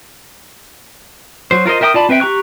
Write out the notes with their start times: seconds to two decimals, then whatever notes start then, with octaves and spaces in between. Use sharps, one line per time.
1.51 F#3 C5
1.66 F4 A#4 C5 D#5
1.81 A#4 E5 G5 A#5 D#6
1.94 F4 D5 A5 B5
2.09 C4 B4 E5 G5
2.20 G4 A#5 C#6 F#6